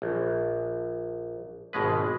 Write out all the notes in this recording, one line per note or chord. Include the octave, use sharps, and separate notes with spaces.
A#1
G#1 B2 G#3 B4